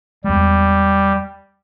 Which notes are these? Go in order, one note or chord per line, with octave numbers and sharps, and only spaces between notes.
E2 G3 G#3